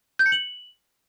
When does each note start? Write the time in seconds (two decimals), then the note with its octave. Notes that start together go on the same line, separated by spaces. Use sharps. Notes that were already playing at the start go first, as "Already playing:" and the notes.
0.19 G6
0.26 C#7
0.32 F#7